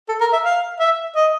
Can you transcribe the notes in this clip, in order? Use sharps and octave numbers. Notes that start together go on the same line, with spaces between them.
A4
A#4
E5
F5
E5
D#5